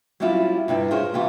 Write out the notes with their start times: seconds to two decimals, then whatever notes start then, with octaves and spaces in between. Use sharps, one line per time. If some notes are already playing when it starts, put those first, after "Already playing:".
0.20 F#3 G3 C4 C#4 E4 F4
0.68 G2 C3 C4 E4
0.91 F4 G#4 A#4 C5 C#5
1.14 C3 E3 G3 F4 F#4